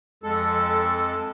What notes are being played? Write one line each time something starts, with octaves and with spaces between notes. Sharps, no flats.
F2 G#3 A4